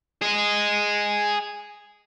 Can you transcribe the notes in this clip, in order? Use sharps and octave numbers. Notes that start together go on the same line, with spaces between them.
G#4 D#5